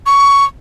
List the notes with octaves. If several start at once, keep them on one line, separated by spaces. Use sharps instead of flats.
C#6